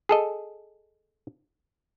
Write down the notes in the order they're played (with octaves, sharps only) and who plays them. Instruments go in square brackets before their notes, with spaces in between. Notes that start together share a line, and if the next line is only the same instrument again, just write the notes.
[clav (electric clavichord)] G#4 A4 D#5